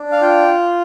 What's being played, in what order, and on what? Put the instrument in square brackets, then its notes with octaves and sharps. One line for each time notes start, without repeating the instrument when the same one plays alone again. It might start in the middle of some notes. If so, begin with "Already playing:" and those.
Already playing: [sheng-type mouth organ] D4
F5
F4 G5